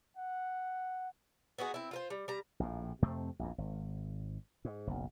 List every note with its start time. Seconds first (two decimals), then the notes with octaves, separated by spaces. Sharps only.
0.17 F#5
1.58 B3 D#4 F#4 G#4
1.74 C4 E4
1.91 F4 A#4 C5
2.10 G3
2.28 G3 A#5
2.60 A#1 A2
3.02 F2 C3 A3 C4
3.39 A#1 E2
3.58 G#1
4.65 G#2
4.87 F#1 B1